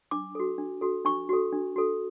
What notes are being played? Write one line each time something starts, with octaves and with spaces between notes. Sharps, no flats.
D4 D6
F#4 A4
D4
F#4 A4
D4 C#6
F#4 A4
D4
F#4 A4